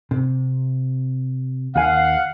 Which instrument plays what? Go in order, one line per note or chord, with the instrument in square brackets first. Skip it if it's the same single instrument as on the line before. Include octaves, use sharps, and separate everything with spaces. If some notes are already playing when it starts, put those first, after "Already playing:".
[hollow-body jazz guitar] C3
[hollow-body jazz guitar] D#2 G#5 [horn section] F5 F#5